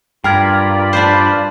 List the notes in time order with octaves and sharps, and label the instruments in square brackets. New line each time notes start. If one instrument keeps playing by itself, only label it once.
[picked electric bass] G2 [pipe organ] F4 D5 B5 [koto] A#4 [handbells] G5 F6 G#6
[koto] D4 B4 C5